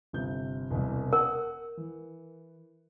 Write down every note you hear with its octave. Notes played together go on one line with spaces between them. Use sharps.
G1 C3 G6
E1 C2
A#4 F#5 D#6
E3